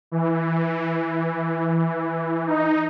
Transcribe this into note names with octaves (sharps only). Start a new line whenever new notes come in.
E3
D#4